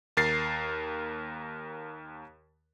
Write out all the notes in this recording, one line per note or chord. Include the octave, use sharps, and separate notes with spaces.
D#2 A#4 A6 C7